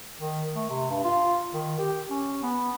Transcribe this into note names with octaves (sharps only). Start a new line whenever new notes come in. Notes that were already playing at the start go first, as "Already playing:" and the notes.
D#3
A3
C3
G2
F4
D#3
G4
C#4
B3